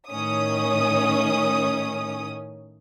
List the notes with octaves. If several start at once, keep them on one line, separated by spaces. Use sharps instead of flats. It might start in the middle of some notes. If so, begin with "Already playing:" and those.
A2 D#3 C#4 D#6